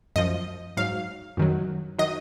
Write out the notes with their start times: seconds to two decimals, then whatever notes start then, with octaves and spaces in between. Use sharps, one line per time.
0.16 F#2 F3 D#5
0.77 G#2 F#3 F5
1.37 F#2 D#3 F#3
1.99 D#3 F#3 D#5